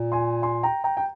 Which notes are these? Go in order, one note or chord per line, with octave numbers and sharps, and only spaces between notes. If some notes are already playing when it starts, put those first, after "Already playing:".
Already playing: A#2
G#5 C6
G#5 C6
G5 A#5
G5 A#5
G5